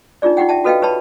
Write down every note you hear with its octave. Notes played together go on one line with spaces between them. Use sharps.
D4 D#4 F4 G#4 D5
D#4 F4 G4 F#5 G5
E5 G5 A5
F#4 A4 B4 D#5 F5 G5
G4 B4 C#5 A5 B5